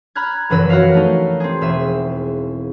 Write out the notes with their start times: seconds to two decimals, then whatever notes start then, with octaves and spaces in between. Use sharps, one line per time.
0.15 A#5 B5 F6 F#6 G#6
0.50 F1 F#2 E3 B4 E6 A#6
0.69 F#4 A#4 C#5 F5 B6
0.94 A3 D#4
1.40 C4 G#4
1.61 E1 E5 D#7